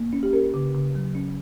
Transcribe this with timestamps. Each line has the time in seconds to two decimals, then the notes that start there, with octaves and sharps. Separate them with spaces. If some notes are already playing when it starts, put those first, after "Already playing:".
Already playing: A#3
0.13 C#4
0.23 G4
0.33 C#4 A#4
0.54 C#3
0.75 C#3
0.95 F#3
1.15 C#4